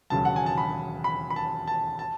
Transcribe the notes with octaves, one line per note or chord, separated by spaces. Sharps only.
E1 D#2 C#3 F#3 A5
F#5
G#5
A5
B5
B5
B5
A5
A5
A5